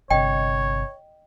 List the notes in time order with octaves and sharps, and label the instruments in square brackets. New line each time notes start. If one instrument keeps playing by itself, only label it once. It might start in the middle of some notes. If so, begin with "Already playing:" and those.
[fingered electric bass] G1 C3 [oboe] C#5 [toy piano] D#5 G5